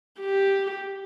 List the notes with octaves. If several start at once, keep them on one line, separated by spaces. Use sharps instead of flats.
G4